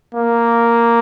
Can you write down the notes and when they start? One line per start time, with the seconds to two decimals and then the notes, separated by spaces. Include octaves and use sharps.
0.15 A#3